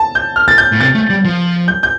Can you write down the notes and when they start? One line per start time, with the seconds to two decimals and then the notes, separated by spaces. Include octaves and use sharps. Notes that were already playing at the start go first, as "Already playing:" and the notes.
Already playing: A5
0.15 G6
0.36 F6
0.48 A6
0.58 G6
0.72 A2
0.81 C3 A6
0.95 A3
1.10 G3
1.25 F3
1.68 G6
1.83 G6